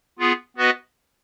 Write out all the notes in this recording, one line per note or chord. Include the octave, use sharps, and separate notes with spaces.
B3 F4 G#4
B3 F#4 B4 D#5